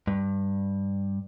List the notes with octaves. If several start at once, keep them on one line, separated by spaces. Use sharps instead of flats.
G2